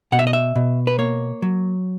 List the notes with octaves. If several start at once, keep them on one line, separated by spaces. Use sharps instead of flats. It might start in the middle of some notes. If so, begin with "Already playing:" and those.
B2 F#5
E5
D#5
E5
B2
B4
A#3 C#5
F#3